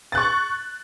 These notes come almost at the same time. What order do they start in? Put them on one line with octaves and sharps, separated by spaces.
A6 F#6 C#6